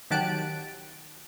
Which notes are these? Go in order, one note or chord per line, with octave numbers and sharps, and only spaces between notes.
D#3 F#3 G4 A5 F#6 D7